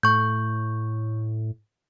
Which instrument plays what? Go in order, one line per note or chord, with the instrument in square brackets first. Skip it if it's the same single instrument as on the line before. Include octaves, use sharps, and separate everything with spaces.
[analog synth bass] A2 [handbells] C#6 G6